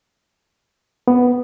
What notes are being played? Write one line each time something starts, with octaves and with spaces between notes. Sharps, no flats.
B3